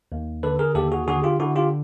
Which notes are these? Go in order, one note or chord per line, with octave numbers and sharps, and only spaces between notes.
D#2
D3 A4 B4
G#4 A#4
D#2 G4 A4
F#4 G#4
D3 F#4 G#4
F4 G4
D3 E4 F#4
F4 G4